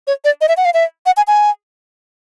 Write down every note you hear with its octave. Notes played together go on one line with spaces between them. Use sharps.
C#5
D5
D#5
E5
F#5
F5
E5
F#5
G#5
G#5